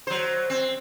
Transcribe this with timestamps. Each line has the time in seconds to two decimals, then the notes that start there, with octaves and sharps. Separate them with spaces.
0.07 F#3 C5
0.50 C4